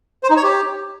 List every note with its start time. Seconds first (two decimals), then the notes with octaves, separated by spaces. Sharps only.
0.23 C5
0.30 D#4
0.36 C#5
0.43 G4